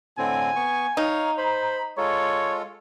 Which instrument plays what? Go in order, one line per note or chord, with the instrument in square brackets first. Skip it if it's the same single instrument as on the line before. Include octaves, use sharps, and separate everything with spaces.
[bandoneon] A2 D3 C4 [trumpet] G#5
[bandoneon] B3 C#6
[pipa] D#4 [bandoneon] C#5 F5
[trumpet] C5 [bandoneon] B5
[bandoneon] G#3 F4 A4 [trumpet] C#5